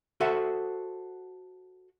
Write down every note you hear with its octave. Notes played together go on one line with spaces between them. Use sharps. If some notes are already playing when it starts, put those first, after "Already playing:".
F#4 A4 C5 E5 F#5